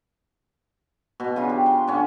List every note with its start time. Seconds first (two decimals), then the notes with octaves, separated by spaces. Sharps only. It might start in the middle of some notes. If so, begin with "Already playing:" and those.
1.20 B2
1.36 C#3 D4 F4
1.49 G4
1.66 C6
1.87 D3 C#4 D4